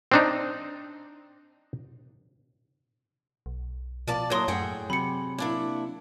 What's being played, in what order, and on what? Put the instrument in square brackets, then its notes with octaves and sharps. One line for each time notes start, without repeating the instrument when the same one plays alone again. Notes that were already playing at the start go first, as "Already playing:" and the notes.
[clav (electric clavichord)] C4 D4 D#4
[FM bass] B1
[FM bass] B2 [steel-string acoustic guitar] F3 D5 A5
[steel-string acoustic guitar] E2 F#3 [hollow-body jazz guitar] A#3 A#4 [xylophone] C#5 C6 D#6
[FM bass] F#2 [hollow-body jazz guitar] A2 [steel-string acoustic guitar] G#4 F#5 G5
[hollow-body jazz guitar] C3 [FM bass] F#3 [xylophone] B5 C#7
[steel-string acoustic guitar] A#3 D4 E4